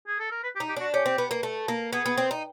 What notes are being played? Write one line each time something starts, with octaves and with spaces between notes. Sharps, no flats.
G#4
A4
A#4
B4
G4
D#4
G4
D4 F#4
C#4 G4
C4
B3
A#3
A3
A#3
B3 G#4
B3
C4
D#4